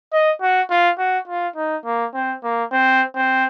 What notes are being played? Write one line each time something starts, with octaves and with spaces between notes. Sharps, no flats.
D#5
F#4
F4
F#4
F4
D#4
A#3
C4
A#3
C4
C4